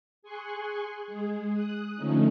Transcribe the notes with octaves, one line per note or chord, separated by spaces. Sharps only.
G#4 G#5 C6 C#6 F#6
G#3 G#4
D#6 F#6
D3 F3 A3 C#4 D#4